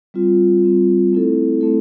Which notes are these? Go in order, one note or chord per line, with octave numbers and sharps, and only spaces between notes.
G3 C4 F4
G3 C4 F4
A3 C4 E4 A4
A3 C4 E4 A4